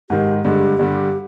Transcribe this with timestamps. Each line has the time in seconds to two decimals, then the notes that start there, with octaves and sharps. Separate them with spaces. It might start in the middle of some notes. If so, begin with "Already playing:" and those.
0.10 G#2 D#3 G#3 G4
0.45 G2 D3 G#3 G4
0.79 G2 D3 G3